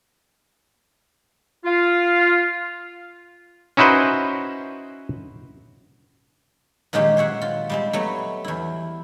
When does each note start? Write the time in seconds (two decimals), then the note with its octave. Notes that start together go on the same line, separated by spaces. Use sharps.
1.65 F4
3.77 C#4 D#4 E4 F#4 B4 C5
6.93 A#2 D#3 F#3 G#3 C#4 G4
7.17 C5 C#5 E5 F#5
7.42 F4
7.70 G3 G#3 C4
7.93 F#3 G3 A3 B3
8.44 E2 E4